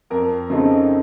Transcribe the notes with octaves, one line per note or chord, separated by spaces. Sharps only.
F2 A#4
C#3 A3 C4 D#4